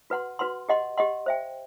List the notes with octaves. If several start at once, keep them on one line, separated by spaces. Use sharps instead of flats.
F#4 B4 F#5 C6
F#4 B4 F#5 C6
G4 D#5 F#5 C6
G4 D#5 F#5 C6
C5 E5 G5